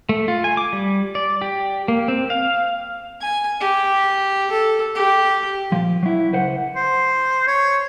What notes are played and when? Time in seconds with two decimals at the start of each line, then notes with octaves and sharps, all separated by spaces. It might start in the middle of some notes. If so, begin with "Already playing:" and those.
0.09 A3
0.28 F4
0.44 G#5
0.57 D6
0.73 G3
1.15 D5
1.42 G4
1.88 A#3
2.08 C4
2.30 F5
3.22 G#5
3.61 G4
4.51 A4
4.95 G4
5.72 A#2 F3
6.03 F#3 E4
6.32 C#2 B4 C5 F#5
6.76 C5
7.47 C#5